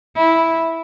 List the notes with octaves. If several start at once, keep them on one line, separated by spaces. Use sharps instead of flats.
E4